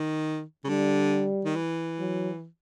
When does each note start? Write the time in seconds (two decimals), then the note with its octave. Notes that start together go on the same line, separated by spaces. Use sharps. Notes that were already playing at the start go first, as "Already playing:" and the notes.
Already playing: D#3
0.64 C#3
0.69 D3 G3
1.45 D#3
1.56 E3
2.00 F#3